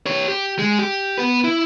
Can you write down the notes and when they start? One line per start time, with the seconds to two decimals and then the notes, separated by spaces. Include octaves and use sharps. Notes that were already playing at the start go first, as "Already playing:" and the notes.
0.06 G4 C#5
0.28 G4
0.59 G#3
0.79 G4
1.18 B3 B4
1.44 E4